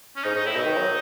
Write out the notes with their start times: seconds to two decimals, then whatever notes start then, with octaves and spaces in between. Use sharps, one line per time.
0.16 C#4
0.23 G#2 D#4
0.35 G#2 D#4
0.45 A2 E4
0.55 B2 D#4
0.66 D#3
0.77 F#3